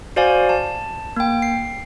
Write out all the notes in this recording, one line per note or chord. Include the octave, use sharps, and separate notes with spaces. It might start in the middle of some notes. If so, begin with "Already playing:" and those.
F#4 C5 D5 F5 G#5
A5
A#3 G5
C7